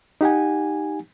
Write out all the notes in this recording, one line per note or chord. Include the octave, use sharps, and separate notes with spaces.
D#4 G4 F#5 G#5